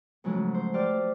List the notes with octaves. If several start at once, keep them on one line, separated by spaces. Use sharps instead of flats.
G#2 C#3 F3 F#3 G#3 A3
C5
G4 C5 D5 F6
A3